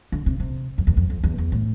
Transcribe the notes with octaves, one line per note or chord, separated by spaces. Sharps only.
D3
C3
C3
F2
E2
F2
F2
E2
E2
A2